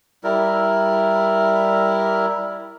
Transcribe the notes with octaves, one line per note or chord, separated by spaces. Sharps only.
G3 E4 A#4